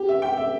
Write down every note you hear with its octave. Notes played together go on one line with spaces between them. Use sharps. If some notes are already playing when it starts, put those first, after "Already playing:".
Already playing: G4
E5
G5
E5